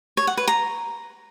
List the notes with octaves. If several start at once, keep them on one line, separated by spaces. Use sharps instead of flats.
C#5
F#5
B4
A#5